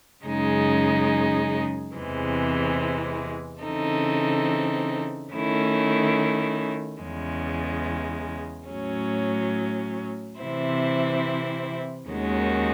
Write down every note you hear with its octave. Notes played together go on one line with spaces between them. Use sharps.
F#2 C#3 G#3 D#4 G#4
E2 C3 E3 G#3 C4
C#3 E3 C4 D#4 A4
D#3 A3 C#4 E4
E2 C#3 G#3
A2 F#3 C#4
C3 E3 C4 E4 C5
D#2 D#3 G#3 C#4 F#4